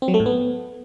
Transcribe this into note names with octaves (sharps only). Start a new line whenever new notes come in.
C4
F#3
A3
A2
B3